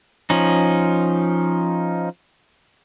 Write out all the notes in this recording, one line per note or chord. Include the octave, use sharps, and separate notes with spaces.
F3 C#4 D#4